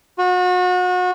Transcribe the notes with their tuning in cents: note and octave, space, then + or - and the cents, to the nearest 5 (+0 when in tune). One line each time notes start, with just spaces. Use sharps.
F#4 -35